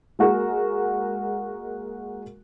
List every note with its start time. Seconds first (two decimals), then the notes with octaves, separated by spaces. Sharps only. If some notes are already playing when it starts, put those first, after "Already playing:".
0.19 G#3 A#3 F#4 G#4 A#4